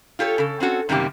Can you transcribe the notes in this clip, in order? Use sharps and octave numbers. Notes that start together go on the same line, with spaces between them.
F4 G4 A4 C#5
C#3 A4
C4 C#4 F#4 A4
F#2 C3 D#3 G3 A#3 G4